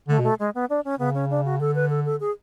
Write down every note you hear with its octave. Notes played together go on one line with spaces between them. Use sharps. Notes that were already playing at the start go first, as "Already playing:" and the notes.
D3 A3
B2 A3
G#3
B3
D4
C#4
C#3 B3
C#4
D4
F#4
D3 A4
B4
A4
A4
G#4